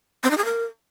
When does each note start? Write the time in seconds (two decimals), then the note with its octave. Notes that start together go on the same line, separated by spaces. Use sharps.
0.24 C4
0.31 D#4
0.38 G#4
0.45 A#4